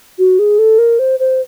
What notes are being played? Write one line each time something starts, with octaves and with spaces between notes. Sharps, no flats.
F#4
G#4
A4
A#4
C5
C5